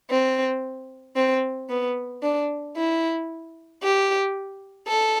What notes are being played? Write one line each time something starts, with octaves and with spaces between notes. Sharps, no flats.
C4
C4
B3
D4
E4
G4
A4